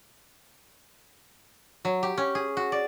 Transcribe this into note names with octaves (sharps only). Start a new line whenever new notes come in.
F#3
G4
C#4
G#4
F#4
D5